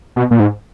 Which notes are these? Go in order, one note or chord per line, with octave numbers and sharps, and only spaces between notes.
B2
A#2
G#2